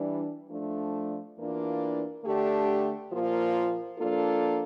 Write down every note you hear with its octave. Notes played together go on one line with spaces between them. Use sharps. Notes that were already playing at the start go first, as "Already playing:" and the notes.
Already playing: E3 G3 D4
F3 A3 D4
E2 E3 A#3 D4 F4
D3 A3 D4 G4
A#2 F3 A#3 F4
F3 A#3 D4 F4 A4